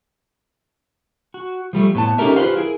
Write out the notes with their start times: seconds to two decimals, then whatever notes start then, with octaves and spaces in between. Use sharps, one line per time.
1.34 F#4
1.73 F3 G3 A3
1.95 A2 B3 A5
2.18 C#4 D#4 G4 A4 A#4 E5
2.36 F4 G4 B4 C5 F5
2.57 E4 G#4 A#4